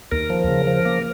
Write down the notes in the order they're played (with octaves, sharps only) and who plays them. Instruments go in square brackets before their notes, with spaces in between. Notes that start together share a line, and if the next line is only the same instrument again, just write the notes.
[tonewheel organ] D#2 A#4
F3
C#3
F3
A#3